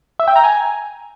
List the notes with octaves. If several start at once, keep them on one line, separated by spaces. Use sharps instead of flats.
E5
G5
A#5
G#5